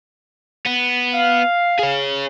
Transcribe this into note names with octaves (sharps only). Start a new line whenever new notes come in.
B3
F5
G#4 C#5